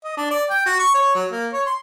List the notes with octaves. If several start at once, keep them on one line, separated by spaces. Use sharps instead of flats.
D#5
D4
D5
G5
F#4
C#6
C#5
F#3
A#3
C#5
C6